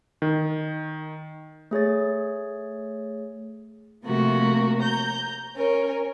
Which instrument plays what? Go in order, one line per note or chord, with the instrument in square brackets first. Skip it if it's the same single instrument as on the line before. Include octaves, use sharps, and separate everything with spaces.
[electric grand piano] D#3
[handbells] A3 G#4 C#5 A6
[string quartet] C3 F3 A3 A#3 F#4 A#4
A#5 G6
C#4 A#4